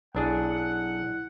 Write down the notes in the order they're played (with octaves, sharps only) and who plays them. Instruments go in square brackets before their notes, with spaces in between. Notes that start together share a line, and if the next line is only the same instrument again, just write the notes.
[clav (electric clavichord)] B1 D4 G#4 [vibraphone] E4 [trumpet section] F#5